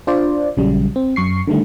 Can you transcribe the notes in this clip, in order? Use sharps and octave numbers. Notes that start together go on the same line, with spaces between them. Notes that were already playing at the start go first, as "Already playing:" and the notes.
D4 F4 C5 D5
A#1 C#3 F#3 G3
C4
F#2 C#6 C7
D3 D#3 G3 A3